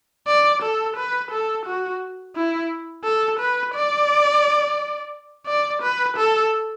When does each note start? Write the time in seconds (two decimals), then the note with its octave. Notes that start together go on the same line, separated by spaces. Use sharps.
0.27 D5
0.63 A4
0.97 B4
1.31 A4
1.66 F#4
2.35 E4
3.04 A4
3.39 B4
3.74 D5
5.47 D5
5.82 B4
6.17 A4